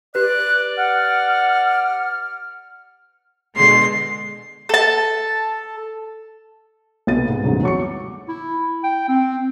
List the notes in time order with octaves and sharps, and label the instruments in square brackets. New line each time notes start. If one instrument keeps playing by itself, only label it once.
[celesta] G4 B4 [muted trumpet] D5 [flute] F#6
[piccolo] F#5 [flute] F6
[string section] B2 D3 G#3 [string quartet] C6
[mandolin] A4 A5
[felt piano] B1 C3 A3 B3 A6 D#7
G#2
G1 D2 G#2 C3 E3
F#3 C#6 C#7
D6
[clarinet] E4
G5
C4